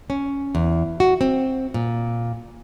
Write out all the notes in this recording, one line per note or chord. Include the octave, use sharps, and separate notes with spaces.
C#4
E2
F#4
C4
A#2